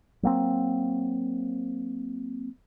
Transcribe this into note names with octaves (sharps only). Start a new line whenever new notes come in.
F#3 A#3 C4